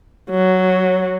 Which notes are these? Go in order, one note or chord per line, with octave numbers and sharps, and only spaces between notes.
F#3